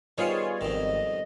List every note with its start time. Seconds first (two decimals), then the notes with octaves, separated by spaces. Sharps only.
0.18 D#3 G3 B3 F4 G#4 C5 C#5
0.61 G#1 F2 D#3 D#5